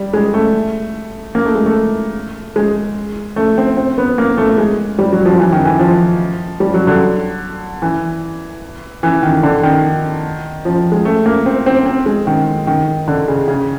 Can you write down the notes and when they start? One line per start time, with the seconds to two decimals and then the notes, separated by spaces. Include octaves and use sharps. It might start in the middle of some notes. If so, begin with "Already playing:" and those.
Already playing: G3
0.14 G#3
0.34 A3
1.35 A#3
1.45 A3
1.55 G#3
1.66 A3
2.56 G#3
3.36 A3
3.58 C4
3.77 C4
3.98 B3
4.18 A#3
4.38 A3
4.58 G#3
4.98 G3
5.12 F#3
5.25 F3
5.39 E3
5.52 D#3
5.65 E3
5.79 F3
6.60 G3
6.74 F#3
6.87 D3
7.82 E3
9.03 E3
9.23 D#3
9.43 D3
9.63 D#3
10.65 F3
10.92 G#3
11.05 A3
11.26 A#3
11.46 C4
11.66 C4
11.86 C4
12.06 G#3
12.27 D#3
12.67 D#3
13.08 D3
13.28 C#3
13.48 C#3